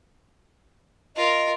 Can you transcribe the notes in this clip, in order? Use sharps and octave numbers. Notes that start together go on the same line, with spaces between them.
F4 A#4 D#5